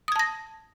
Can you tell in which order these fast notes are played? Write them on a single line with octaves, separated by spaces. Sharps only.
D#6 G#6 A5 A#6